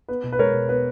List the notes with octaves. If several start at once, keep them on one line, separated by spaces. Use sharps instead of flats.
B3 B4
B2
B4
G#3 A#4 C#5
B2
B3 B4